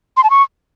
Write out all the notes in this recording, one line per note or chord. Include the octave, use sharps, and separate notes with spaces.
C6
A5
C#6